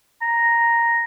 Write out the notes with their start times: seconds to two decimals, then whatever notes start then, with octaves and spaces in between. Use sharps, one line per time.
0.22 A#5